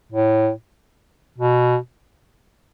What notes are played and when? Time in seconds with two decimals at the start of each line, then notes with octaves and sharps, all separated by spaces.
0.12 A2
1.38 B2